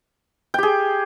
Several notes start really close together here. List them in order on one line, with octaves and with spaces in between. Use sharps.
G5 G4 G#4